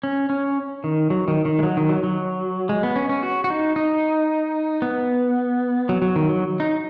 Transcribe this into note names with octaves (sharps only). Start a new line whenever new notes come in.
C#4
C#4
D#3
F#3
D#3
D#3
G#3
F#3
D#3
F#3
F#3
G#3
B3
C#4
C#4
F#4
F#4
D#4
D#4
B3
F#3
F#3
D#3
F#3
D#4